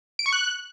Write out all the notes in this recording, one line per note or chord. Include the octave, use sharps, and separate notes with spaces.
D7
C#6
F#6